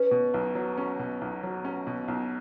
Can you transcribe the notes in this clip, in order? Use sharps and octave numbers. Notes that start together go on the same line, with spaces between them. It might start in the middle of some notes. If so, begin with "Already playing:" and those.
Already playing: C#4 B4
B2
B1
F#3
C#4
B2
B1
F#3
C#4
B2
B1